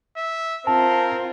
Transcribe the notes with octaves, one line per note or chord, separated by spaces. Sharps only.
E5
C4 F4 A#4 A5